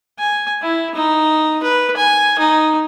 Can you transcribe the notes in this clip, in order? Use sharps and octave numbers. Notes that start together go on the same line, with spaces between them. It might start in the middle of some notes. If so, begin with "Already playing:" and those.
G#5
E4
D#4
B4
G#5
D#4